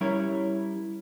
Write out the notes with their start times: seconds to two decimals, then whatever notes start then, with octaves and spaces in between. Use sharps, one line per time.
0.01 G3 C#4 E4 A#4 C#5